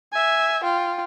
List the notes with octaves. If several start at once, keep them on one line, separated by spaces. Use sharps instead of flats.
E5 G#5
F4 G5